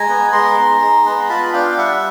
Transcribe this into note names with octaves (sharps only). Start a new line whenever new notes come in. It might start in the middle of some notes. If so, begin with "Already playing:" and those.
Already playing: G#3 G#5 A#5
B3
G#3 A#5 C6
D#4
G#3
B3
F4 A5 B5
D4 F5 G5
G3 E5 F#5